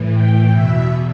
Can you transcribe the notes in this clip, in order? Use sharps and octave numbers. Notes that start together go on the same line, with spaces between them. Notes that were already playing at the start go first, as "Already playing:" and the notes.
Already playing: A2 E3
G5
E2 B2 E5